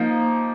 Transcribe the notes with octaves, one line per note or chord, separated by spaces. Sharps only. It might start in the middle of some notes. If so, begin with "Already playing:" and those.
Already playing: F3 A#3 D#4